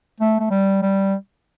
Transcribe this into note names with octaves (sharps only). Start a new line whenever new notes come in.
A3
A3
G3
G3